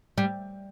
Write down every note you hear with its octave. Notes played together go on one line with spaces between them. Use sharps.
G3